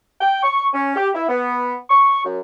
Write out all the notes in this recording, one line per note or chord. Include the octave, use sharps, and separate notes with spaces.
G5
C#6
C#4
G4
E4
B3
C#6
F#2